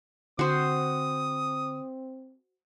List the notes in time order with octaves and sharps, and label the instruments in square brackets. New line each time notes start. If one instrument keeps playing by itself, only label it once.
[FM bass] D3 [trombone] C4 [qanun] F#4 C5 [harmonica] D#6